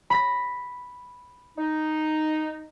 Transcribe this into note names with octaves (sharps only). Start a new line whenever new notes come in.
B5 A#6
D#4